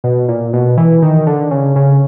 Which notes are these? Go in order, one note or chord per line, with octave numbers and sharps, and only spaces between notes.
B2
A#2
B2
E3
D#3
D3
C#3
C#3